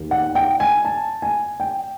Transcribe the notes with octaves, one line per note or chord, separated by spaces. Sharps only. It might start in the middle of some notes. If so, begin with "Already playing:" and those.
Already playing: D#2 D#3
F#5
G5
G#5
A5
G#5
G5